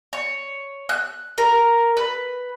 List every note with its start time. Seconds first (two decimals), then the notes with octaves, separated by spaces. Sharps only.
0.13 C#5
0.89 F#6
1.38 A#4
1.97 B4